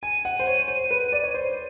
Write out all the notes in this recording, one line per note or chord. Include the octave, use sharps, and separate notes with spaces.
G#5 D#7
F#5
C5
C#5
C5
B4
D5
C#5
C5